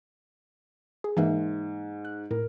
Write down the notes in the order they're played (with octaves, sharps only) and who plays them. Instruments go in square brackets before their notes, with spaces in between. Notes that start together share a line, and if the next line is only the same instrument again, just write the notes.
[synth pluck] G#4
[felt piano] G#2 [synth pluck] E3 A#3 E5
[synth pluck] F#6
[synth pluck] A2 [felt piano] A#4